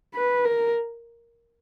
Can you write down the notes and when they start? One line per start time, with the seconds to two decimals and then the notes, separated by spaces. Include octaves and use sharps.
0.15 B4
0.45 A#4